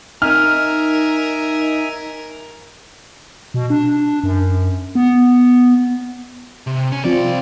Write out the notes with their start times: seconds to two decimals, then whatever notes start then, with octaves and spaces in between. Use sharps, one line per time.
0.22 D#4 A#4 E5 G#5 F6
3.54 B2
3.70 D4
4.24 F#2
4.95 B3
6.67 C3
6.92 C#4
7.04 C2 F3 C4 F4 D5